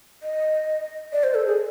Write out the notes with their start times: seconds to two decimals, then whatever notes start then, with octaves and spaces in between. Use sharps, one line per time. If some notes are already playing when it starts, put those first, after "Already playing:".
0.23 D#5
1.13 D5
1.24 C5
1.35 A4
1.46 G#4